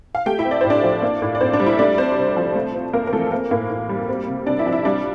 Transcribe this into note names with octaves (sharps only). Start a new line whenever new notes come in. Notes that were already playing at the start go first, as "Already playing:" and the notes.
F5
A3 G4 G5
E4 E5
C4
D5
A2 C5
D4 D5
F3
A#3
A2
D5
A2 C4 C5
D4 D5
G3
E4 E5
A3 D4 D5
C4 C5
C3
F3
A3
C4
F2 A#3 A#4
A#4
E3 A3 A4
A#3 C4 A#4
A2 A#3 A#4
A2
G3
C4
C3
C3 D4 D5
E4 E5
F3 D5
E4 E5
G3 D4 D5